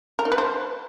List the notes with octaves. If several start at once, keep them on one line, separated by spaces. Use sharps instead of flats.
A#4
D#4
B4
C5